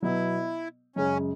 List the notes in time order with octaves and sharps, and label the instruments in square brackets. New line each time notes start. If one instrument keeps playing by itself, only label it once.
[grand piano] B2 F#3 B3 F#4 [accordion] E4
[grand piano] F#2 C#3 G#3 [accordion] C#4